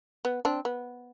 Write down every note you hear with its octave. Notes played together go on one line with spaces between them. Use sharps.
B3
C4 D4
B3